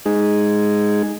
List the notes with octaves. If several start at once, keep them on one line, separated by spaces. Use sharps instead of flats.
G#3 D#4 G#4